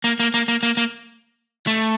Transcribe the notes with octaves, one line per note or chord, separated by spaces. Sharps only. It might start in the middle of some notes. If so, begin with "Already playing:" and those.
A#3
A#3
A#3
A#3
A#3
A#3
A3